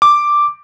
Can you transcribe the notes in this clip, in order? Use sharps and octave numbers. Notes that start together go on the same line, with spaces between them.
D6